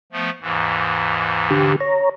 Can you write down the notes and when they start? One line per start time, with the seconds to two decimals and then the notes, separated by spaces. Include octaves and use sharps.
0.12 F3 A3 B3
0.41 D#2 G#2 E3
1.50 D3 G4
1.80 C#5 A#5